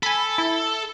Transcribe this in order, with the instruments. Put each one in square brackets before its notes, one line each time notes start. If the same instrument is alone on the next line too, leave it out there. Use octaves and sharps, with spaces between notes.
[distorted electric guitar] A4 [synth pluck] G#5 B5
[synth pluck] E4